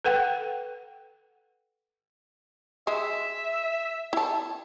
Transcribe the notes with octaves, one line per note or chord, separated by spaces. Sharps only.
A4 B4 F#5 G5
G#3 E5
E4 A5